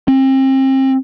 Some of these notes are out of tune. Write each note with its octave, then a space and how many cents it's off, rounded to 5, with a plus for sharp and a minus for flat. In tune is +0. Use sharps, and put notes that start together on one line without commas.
C4 +35